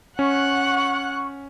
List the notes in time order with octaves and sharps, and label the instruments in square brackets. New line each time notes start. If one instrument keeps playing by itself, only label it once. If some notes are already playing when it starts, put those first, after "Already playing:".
[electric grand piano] C#4 [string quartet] F#5 F#6 [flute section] C#6